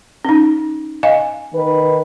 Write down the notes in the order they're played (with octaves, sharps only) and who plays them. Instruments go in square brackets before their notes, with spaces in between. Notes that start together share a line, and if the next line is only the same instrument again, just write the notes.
[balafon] C#4 D#4
D#5 F5 G#5
[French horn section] D#3 B4